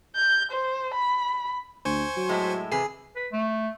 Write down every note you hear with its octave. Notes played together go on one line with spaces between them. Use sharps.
G6
C5
B5
D2 C5 G#5 C#6
F#3
A2 G#3 E4
C3 G#4 B4
B4
A3